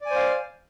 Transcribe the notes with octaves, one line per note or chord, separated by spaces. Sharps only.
C5 D5 F5 G#5